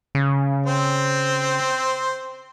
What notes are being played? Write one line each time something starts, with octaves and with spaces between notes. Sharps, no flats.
C#3
C4 C5